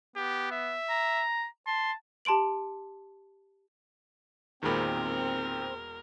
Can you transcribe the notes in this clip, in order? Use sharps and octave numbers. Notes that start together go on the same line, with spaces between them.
B3 G4
E5
A#5
A5 C6
G4 A5 C6 D7 F#7
E1 A#2 D#3 G#3 C4 A#4 B5